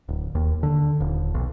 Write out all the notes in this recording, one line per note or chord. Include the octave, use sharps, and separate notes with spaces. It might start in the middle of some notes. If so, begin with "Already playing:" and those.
D1
D#2
D3
D#1
B1